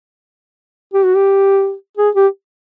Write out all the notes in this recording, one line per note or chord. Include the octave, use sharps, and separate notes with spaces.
G4
F#4
G4
G#4
G4